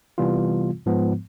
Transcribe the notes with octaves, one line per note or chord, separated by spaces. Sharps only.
C3 E3 G3 B3 F4
G#2 F3 G#3 B3